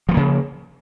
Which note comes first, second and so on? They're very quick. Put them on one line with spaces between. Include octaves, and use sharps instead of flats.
F3 G3 A#3 C#3